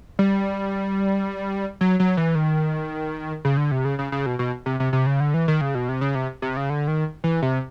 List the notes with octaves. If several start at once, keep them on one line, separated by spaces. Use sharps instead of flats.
G3
F#3
F#3
E3
D#3
C#3
D3
C3
C#3
C#3
C#3
B2
B2
C3
C3
C3
C#3
D3
E3
D#3
C#3
B2
C3
C#3
C3
C3
C#3
D3
D#3
E3
C3